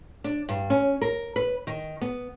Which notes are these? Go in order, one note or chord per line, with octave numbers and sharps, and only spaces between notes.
D4
G2
C#4
A#4
B4
D#3
B3